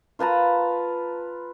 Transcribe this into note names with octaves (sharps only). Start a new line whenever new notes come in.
F4 B4 A5 A#5